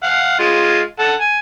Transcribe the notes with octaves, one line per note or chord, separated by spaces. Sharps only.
F5 F#5
G#3 F4
A4 F#5
G#5